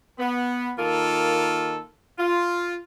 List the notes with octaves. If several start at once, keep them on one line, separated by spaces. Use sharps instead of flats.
B3
D#3 A#3 F4 A4
F4